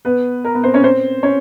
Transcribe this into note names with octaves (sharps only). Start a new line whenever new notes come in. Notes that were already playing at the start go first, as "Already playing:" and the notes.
B3 B4
A#4
B3 B4
C4 C5
C#4 C#5
C4 C5
C#4 C#5